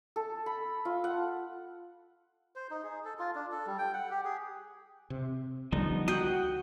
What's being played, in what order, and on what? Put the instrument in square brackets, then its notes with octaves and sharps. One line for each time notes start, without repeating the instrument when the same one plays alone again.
[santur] A4
B5
F4
F#5
[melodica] C5
D#4
G#4
A4
F4
D4
A4
G3
G5
F#5
G4
G#4
[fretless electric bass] C3
[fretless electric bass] C#2 D3 G3 [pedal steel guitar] F3 B3 D#4
[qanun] F#4 [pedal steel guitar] F#5 G5 D#6